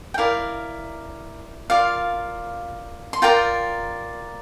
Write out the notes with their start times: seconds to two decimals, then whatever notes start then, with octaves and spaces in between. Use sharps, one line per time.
0.14 G5
0.18 E4 A#4 D5 F5
1.70 F4 A#4 D5 F5
3.13 C6
3.22 F4 A#4 D5 G5 A#5